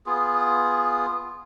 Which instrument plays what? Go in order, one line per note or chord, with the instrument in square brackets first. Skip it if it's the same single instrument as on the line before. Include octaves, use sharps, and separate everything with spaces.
[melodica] B3 F4 G#4